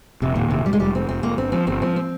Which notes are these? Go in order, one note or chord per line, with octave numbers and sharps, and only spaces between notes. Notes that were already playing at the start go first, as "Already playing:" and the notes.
F1 C3
D#2 A#2
F1 C3
F1 G3
G#3
F1 G3
F1 C4
F1 C4
F1 A#3
G1 C4
F3 C4
G1 C4
F3 C4
C4